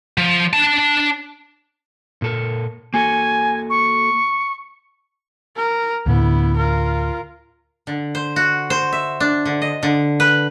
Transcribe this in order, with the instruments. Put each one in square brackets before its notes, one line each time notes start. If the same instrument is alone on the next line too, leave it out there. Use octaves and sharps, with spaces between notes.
[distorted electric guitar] F3
D4 A5
[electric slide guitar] A#2 A4 A#4
[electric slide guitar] A#3 F#4 A4 [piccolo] G#5
[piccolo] C#6
[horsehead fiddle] A#4
[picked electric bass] D2 A2 D3 [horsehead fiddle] B3 E4
[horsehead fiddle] F4 A#4
[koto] D3
C5
F#4
C5
E5
D4
D3
D#5
D3
B4